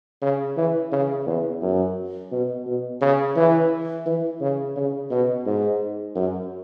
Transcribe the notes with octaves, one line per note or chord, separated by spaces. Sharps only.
C#3
E3
C#3
E2
F#2
B2
B2
C#3
E3
E3
C#3
C#3
B2
G#2
F#2